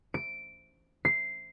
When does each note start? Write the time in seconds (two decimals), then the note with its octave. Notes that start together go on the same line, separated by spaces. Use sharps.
0.14 D7
1.05 C7